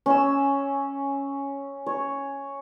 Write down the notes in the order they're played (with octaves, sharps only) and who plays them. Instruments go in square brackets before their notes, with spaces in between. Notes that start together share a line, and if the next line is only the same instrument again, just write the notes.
[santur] C#4 E6
C#5